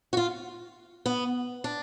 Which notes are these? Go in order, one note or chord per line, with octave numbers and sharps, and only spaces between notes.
F#4
F4
B3
D4